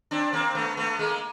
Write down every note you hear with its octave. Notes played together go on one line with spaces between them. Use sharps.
C4 D4
A#3 C4
A3 B3
A3 B3
G#3 A#3